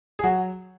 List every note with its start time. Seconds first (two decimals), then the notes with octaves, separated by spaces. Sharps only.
0.19 G#4
0.23 F#3 F#4